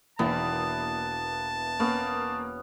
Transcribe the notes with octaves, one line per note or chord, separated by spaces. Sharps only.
E1 A#3 B3 E4 A5
A#3 B3 C#4